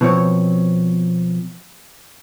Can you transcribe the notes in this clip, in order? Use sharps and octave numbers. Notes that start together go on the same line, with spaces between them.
B2 F3 C4 C#5